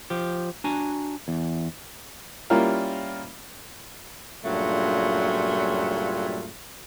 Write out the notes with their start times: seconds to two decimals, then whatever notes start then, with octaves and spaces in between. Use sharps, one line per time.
0.10 F3 G4
0.64 D4 F#4 G#5 A#5
1.28 E2
2.50 G3 A#3 C#4 E4 F4 A#4
4.44 G2 A#2 C#3 F#3 A3 F4